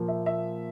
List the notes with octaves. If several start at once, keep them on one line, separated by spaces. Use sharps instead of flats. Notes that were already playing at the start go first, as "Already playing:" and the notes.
Already playing: A#2 F3 A#3
E5
E5